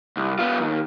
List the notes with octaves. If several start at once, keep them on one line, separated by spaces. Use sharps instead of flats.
C2
B3 F4
D#2